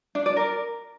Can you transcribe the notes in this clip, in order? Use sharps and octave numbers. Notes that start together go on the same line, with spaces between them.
D4
D5
A#4